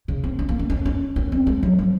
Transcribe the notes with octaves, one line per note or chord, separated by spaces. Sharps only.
C#3
C4
C#4
A#3
C#4
C#4
C#4
C#4
C4
G#3
F#3
F3